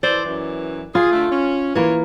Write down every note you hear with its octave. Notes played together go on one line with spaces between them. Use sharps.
E3 A4 C5 D5
F#2 E3
F4 G#4
D3 A3
C#4
E3 A#3 F4 C#5